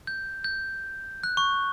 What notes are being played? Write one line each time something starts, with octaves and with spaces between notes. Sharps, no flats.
G6
G6
F#6
C#6